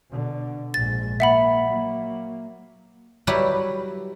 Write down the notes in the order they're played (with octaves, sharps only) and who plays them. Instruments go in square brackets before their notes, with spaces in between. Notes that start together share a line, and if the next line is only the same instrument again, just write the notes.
[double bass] B2 D3
[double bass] A#1 G#2 [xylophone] A6
[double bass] A#3 [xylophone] E5 F#5 B5
[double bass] F#3 A#3
[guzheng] F#3 G3 E4 G4 B4